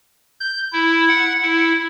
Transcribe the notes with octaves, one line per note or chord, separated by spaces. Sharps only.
G6
E4
F#5
E4